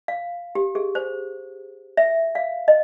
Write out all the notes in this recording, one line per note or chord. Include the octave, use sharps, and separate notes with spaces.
F5
G4
G#4
C5
E5
F5
D#5